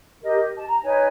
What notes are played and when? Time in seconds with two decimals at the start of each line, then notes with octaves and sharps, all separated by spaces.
0.23 G4 A#4 D#5
0.38 G4
0.55 A5
0.68 A#5
0.83 D#4 B4 C#5 G#5